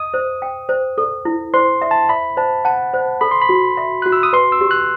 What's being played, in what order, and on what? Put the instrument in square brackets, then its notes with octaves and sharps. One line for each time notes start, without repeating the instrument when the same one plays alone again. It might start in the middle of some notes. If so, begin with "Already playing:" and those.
Already playing: [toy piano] D#5 [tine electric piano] D#6
[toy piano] C5
G5
C5
A4
E4
[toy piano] C5 [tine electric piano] C6
[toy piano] E5
[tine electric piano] A5
[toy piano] E5 [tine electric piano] B5
[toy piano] C5 [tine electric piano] A5
[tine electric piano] F#5 [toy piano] A5
[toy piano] C5
[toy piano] A4 [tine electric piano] B5
[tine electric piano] C6
B5
[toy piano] F#4
E5
[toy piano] F#4 [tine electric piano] F#6
[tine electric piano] E6
D#6
[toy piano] B4 [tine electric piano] C6
[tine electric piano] E6
[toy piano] G4
[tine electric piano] F#6